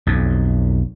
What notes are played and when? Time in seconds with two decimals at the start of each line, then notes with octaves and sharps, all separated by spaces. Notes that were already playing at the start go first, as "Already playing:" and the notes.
0.07 B1 F2